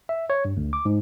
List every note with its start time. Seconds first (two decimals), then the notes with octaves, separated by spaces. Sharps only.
0.09 E5
0.30 C#5
0.45 G2
0.57 D2
0.73 D6
0.85 G#2